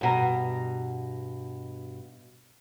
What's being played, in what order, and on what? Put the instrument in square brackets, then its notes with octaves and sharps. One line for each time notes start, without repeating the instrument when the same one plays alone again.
[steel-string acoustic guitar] G2 B2 A#5